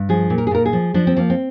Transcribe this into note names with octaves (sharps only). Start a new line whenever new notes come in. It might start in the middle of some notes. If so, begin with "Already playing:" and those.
Already playing: G2
F3 G#4
A#2
A#4
G#4
A#2 A#4
G#4
F3
F3 D4
C4
F3 A#3
C4